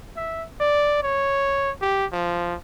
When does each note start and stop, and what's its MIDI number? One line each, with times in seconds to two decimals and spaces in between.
0.17 0.45 76
0.60 0.99 74
1.03 1.71 73
1.82 2.06 67
2.12 2.55 53